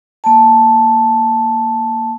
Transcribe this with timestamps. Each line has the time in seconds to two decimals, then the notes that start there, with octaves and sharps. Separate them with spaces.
0.24 A#3 A5